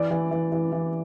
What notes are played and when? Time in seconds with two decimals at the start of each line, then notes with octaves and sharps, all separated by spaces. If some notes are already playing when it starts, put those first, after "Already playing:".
Already playing: E3 D5
0.10 E3
0.31 E3
0.52 E3
0.72 E3